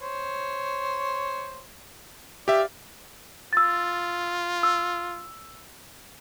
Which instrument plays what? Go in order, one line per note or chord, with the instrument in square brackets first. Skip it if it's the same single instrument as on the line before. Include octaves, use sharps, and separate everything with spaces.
[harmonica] C5 C#5
[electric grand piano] G4 E5 [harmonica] D5 F5
[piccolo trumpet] F4 [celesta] E6 A6
[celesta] E6